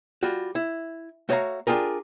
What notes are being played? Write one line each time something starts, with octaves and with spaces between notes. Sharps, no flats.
G3 F4 F#4
E4
A3 F#4 C#5 D5 F5 A#5
D4 F4 G4 G#4 A#4